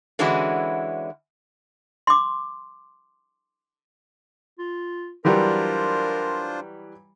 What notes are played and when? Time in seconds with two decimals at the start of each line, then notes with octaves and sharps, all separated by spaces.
0.19 D3 E3 G#3 C#4 E4 F#4
2.07 C6 D6
4.59 F4
5.25 E3 F#3 G3 D4 F4 A#4 C5